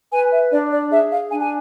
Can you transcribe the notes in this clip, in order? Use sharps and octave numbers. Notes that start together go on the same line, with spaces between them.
B4 G#5
E5
D4 D5
D5
G#4 E5
F5
D4 G#5
G#5